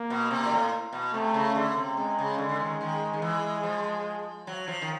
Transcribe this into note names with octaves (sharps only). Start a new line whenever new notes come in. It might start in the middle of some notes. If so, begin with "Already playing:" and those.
Already playing: A#3
B2
C3
A#2
A2
B2
C3 A3
C#3
D3
C3
C3 G#3
C#3
D3
D3
D#3
D#3
D#3
E3
F3
F#3
F3
D#3